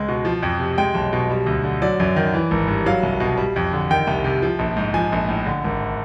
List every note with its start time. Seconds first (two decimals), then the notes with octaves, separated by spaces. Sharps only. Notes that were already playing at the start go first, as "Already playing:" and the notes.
Already playing: C#2 G#3
0.09 B2
0.25 F3
0.43 F2
0.60 C3
0.78 G#3 G5
0.95 B1
1.13 B2
1.30 G3
1.46 D2
1.64 D3
1.82 F#3 D5
2.00 F#2
2.16 D#3
2.34 E3
2.51 G#1
2.68 G2
2.86 F#3 F5
3.03 C2
3.20 B2
3.37 G3
3.56 F2
3.73 D3
3.91 D#3 G5
4.07 C2
4.24 C3
4.42 F3
4.59 A#1
4.76 G#2
4.94 F3 G#5
5.12 A#1
5.29 A2
5.46 D3
5.64 G#1